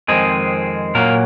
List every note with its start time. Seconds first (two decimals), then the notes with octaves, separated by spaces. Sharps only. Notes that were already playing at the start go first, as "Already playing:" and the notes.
0.08 F2 D#3 G#3 C4 G#4
0.95 A#2 F#3 A#3 A#4